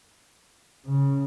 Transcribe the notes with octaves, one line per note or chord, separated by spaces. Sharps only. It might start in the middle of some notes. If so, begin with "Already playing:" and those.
C#3